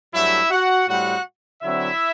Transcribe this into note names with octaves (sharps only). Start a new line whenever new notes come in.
G2 F#3 A3 E4 E5
F#4 F#5
A2 G3 C4 F#4 F#5
D3 F#3 C4 E4 E5